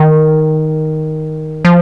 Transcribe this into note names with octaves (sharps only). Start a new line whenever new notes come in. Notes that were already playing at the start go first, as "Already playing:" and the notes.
Already playing: D#3
F3